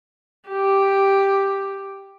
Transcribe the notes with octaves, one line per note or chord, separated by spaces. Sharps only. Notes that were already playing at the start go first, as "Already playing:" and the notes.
G4